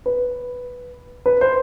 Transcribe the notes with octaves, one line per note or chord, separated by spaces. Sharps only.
B4
B4
C5